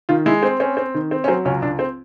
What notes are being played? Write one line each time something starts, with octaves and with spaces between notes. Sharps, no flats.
D#3 F4
G#3 E4
C4
C4 C#4
C4
D#3
C4
C#4
F#3 C4
C#2 C#4
C#2 D4
C4